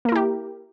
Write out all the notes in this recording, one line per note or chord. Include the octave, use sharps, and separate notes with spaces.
A#3 E4 G4 A#4